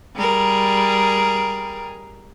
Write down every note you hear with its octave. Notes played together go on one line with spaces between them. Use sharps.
G3 G#4 A#4